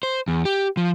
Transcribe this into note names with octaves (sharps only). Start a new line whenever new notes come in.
C5
E2
G4
F3